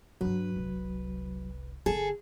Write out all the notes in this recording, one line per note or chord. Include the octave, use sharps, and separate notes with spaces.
G2 F#3 D4 B4
F1 C2
G1 D3 G#4 A4